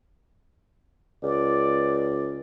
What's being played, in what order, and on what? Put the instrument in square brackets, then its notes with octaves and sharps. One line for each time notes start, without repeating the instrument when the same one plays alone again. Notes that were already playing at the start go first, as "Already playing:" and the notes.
[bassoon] C#2 [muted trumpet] D5